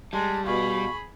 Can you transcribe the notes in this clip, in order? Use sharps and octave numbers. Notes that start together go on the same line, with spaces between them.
G3 G#3 A5
B2 G#4 F5 B5 C#6